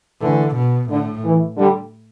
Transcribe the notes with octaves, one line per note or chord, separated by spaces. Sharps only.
D3 E3 A3
B2
A2 D3
E3
D3 G3